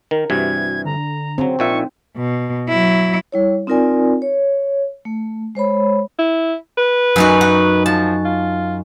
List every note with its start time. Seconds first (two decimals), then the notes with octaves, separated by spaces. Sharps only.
0.11 D#3 A#4
0.30 G2 C3 E3 F#4 G#6
0.85 D3 A#5
1.38 C#3 F#3 C4
1.59 A#1 A#2 D#4 E5 C#6
2.16 B2
2.69 F#3 E4
3.32 G3 E4 C#5
3.67 C4 D#4 F4 A#4 D5 G#5
4.22 C#5
5.05 A3
5.55 G#3 C5 C#5 B5
6.19 E4
6.78 B4
7.16 F#2 D#4 F#4
7.41 F#4
7.86 F3 A5
8.25 F4